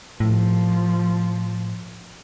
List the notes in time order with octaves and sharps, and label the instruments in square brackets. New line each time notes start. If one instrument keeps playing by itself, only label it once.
[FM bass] A2 [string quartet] F3